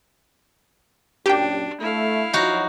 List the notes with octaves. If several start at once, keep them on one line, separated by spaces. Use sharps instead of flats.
F#2 A#2 D4 G4 G5
A3 E4 F5
F3 F#3 D#4 F#4